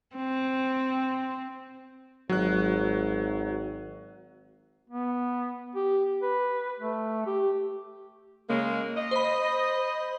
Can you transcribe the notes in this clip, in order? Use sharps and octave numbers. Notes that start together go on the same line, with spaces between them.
C4
G#1 F#3 F#6
B3
G4
B4
A3
G4
C#3 G#3 A#3
D#5
C5 B5